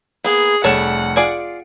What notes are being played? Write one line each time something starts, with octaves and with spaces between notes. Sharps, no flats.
A#3 B3 G#4
F1 G3 A3 C#5 F#5 A5 E7
F4 G#4 D5 G#5 D7